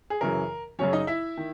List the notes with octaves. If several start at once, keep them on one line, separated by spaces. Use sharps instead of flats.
G#4
F#2 C#3 E3 A#4
F#2 C#3 F#3 C#4 C#5
D#4 D#5
E4 E5
D#3